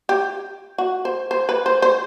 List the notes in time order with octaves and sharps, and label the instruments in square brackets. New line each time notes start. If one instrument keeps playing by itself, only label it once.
[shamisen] G4
F#4
C5
C5
B4
C5
C5